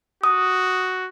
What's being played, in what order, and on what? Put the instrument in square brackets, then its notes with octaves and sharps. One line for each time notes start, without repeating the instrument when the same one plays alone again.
[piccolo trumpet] F#4 [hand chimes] D#6